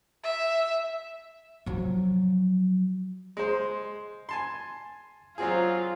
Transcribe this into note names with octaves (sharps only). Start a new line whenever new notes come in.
E5
F3 F#3
G#3 C5
G#5 A5 C6
F#3 C4 F4 G#4